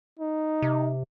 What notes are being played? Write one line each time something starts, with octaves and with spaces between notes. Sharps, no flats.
D#4
C3